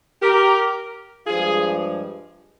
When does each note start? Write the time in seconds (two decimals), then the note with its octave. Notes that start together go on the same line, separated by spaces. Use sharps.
0.22 G4 A#4
1.26 G2 F3 G#3 F4 G#4